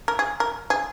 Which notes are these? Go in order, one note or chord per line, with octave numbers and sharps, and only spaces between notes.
A#4
G#4
A#4
G#4